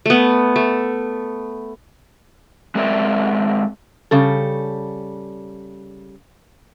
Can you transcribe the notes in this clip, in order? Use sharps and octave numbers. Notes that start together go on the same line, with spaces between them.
A3 B3
A3
G#3 C4 G#4 A#4 D5 E5
C#3 G3 A4